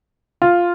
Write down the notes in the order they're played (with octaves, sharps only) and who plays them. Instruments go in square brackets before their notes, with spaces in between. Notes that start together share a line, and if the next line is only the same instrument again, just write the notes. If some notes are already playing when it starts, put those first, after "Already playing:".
[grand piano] F4